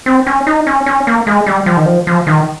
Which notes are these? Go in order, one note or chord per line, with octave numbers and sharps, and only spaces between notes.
C4
C#4
D#4
C#4
C#4
A#3
G#3
G3
F3
D#3
F3
F3
D#3